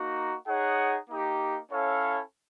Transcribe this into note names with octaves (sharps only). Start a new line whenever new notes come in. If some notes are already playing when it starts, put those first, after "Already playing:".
Already playing: A#3 D#4 F#4
D#4 G#4 C#5 F#5
A#3 D#4 G4
C#4 E4 A4 C#5 F5